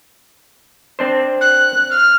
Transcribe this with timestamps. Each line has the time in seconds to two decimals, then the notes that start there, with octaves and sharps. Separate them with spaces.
0.99 C4 D4 C5
1.41 F#6
1.91 F6